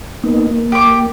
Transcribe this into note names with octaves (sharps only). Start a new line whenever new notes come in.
A#3 B3 D#4
A#3
G4 D6